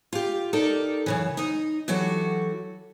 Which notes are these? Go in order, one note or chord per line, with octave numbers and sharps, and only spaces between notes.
F4 G4
D#4 G4 A4 A#4 D5
F#2 C#3 E3
D#4 D#5
E3 F#3 F#4 G4 A4